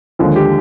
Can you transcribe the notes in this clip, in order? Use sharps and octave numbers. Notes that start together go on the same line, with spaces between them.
D#2 D3 F3 G#3
G4